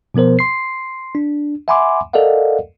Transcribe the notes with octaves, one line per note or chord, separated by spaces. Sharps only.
B2 F3 B3 A#4 C5
C6 C7
D4
E5 F#5 G#5 B5 C6 D6
A4 A#4 D5 D#5 F5 F#5